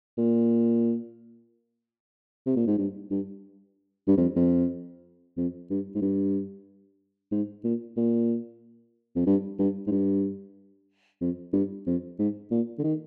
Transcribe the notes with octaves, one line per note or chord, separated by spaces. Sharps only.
A#2
C3
A#2
G#2
G2
G2
G2
F2
F2
F2
G2
G#2
G2
G#2
A#2
A#2
F2
G2
G2
G#2
G2
F2
G2
F2
G#2
A#2
D3
D#3